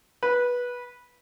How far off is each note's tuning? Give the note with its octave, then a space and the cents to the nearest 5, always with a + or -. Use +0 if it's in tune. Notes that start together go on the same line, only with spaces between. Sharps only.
B4 -15